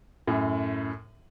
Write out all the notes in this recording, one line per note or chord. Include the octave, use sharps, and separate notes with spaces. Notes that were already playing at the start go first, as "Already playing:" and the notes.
F#2 A2